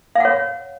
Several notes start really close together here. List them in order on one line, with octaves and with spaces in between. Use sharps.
F5 F#5 C#5